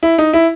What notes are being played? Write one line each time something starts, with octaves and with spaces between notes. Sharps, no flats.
E4
D#4
E4